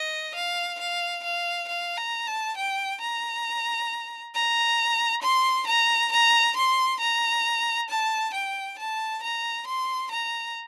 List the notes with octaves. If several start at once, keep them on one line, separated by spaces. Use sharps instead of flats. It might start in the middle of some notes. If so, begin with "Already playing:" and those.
Already playing: D#5
F5
F5
F5
F5
A#5
A5
G5
A#5
A#5
C6
A#5
A#5
C6
A#5
A5
G5
A5
A#5
C6
A#5